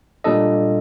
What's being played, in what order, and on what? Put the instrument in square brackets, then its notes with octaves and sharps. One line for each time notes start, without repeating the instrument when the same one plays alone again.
[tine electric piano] A#2 G3 D4 A4 D#5